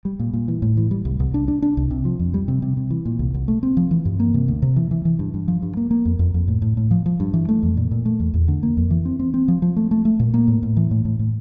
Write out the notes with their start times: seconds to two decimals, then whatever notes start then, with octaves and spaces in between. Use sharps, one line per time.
0.05 G3
0.20 A#2
0.34 A#2
0.48 E3
0.62 A2
0.77 E3
0.91 G3
1.05 C2
1.20 C2
1.34 D4
1.48 D4
1.62 D4
1.77 C2
1.90 C3
2.05 F3
2.19 F2
2.34 G3
2.48 C3
2.62 C3
2.77 C3
2.90 E3
3.05 A#2
3.19 C2
3.34 C2
3.48 A3
3.63 C4
3.77 F3
3.91 E3
4.05 G2
4.20 A#3
4.34 C3
4.48 D2
4.62 C3
4.76 E3
4.91 E3
5.05 E3
5.19 G2
5.34 G2
5.48 F3
5.62 G2
5.77 A#3
5.91 A#3
6.05 F2
6.19 F2
6.34 F2
6.48 A2
6.62 A2
6.77 A2
6.91 F3
7.06 F3
7.20 G2
7.34 E3
7.49 A3
7.63 F2
7.77 A#2
7.91 A#2
8.05 A3
8.20 E2
8.34 E2
8.48 D3
8.63 A#3
8.77 F2
8.91 E3
9.05 C4
9.19 C4
9.34 C4
9.48 F3
9.62 F3
9.77 A3
9.91 A3
10.05 A3
10.20 A#2
10.34 A#3
10.48 A2
10.63 A2
10.77 E3
10.91 A2
11.05 A2
11.19 A2